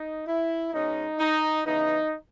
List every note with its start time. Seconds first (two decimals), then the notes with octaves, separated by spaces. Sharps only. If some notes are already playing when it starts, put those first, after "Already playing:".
Already playing: D#4
0.27 E4
0.73 B2 G#3 C#4 D#4
1.19 D#4
1.65 C#3 E3 B3 D#4